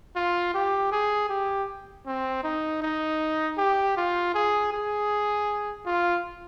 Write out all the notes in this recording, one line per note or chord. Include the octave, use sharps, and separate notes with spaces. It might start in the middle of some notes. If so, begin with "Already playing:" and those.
F4
G4
G#4
G4
C4
D#4
D#4
G4
F4
G#4
G#4
F4